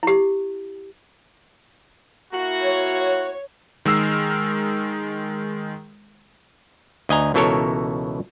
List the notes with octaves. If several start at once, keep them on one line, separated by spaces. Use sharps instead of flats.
E4 G4
A#3 E4 F#4
C#5
D#3 G#3 A#4 E6 F6 C7
D2 D#5 G#5 A#5
C#2 B2 E3 A4 A#4 C#5